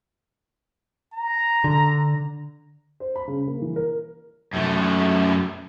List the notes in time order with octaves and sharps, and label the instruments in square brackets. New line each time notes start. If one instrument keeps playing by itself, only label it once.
[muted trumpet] A#5
[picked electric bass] D3
[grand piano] C5
B5
C#3
A#3
E3
A#4
[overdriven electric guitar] F#2 A3